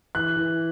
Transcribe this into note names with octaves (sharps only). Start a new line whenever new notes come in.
E3 F#6
E3